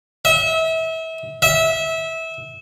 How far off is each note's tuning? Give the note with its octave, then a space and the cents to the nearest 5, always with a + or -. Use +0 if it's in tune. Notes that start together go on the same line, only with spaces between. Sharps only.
E5 -30
E5 -20